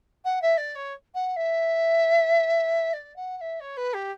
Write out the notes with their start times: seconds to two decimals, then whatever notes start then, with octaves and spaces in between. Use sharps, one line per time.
0.24 F#5
0.42 E5
0.57 D5
0.75 C#5
1.14 F#5
1.36 E5
2.93 D5
3.16 F#5
3.37 F#5
3.41 E5
3.60 C#5
3.77 B4
3.93 G4